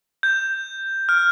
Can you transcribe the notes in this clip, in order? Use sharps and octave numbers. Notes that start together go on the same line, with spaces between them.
G6
F6